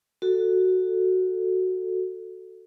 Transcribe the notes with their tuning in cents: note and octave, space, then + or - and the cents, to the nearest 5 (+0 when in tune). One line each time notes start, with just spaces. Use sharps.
F#4 +0 A4 +10